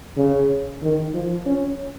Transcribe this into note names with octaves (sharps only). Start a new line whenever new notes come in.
C#3
D#3
F3
C#4